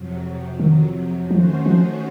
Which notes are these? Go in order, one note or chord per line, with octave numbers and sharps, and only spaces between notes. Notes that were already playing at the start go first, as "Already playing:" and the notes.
Already playing: F2 C3 F#3
D#3
D#3 F3 A3 C#4 F#4 C5
F3